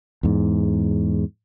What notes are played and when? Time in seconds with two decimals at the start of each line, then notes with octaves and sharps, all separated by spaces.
0.23 E2 G#2